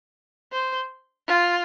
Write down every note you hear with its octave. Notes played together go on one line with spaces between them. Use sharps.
C5
F4